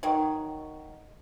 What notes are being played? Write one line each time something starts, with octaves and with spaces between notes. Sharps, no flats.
D#3 F#3